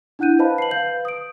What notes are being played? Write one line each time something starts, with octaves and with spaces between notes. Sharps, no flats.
D4 E4 F#5 F#6 G6 D#7
B4 C5 D#5 F5 A5 B5
C7 F#7
B4 F5 G6 F#7
D#6 D7